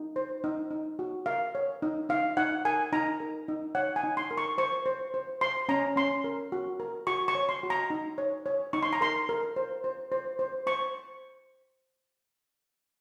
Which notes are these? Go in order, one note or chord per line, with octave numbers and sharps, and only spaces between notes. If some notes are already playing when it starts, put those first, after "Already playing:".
Already playing: D#4
C5
D#4
D#4
F#4
A#4 F5
C#5
D#4
D#4 F5
D#4 F#5
A#4 G#5
D#4 A#5
A#4
D#4
C#5 F#5
G#5
D#4
C6
A#4
C#6
C5 C#6
C5
C5
C5 C6
C#4 A#5
C#4 C6
A#4
F#4
A#4
F#4 C#6
C#6
C#5
C6
F#4
A#5
D#4
C#5
C#5
D#4 C#6
C6
A#5
A#4 C6
A#4
C5
C5
C5
C5
C5 C#6